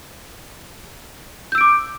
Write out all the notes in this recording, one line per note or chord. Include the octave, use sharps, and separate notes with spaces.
D6 E6 G6 D7